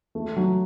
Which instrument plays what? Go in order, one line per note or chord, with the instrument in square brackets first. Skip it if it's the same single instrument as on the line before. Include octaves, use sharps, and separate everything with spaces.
[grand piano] A3
F#3